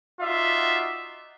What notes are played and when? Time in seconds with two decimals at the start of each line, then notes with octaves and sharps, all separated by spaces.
0.21 D#4 F4 F#4 D5 E5